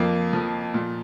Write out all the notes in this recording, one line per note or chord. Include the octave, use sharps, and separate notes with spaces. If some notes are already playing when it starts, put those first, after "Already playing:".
Already playing: F2 F3 A#3
F3
A#2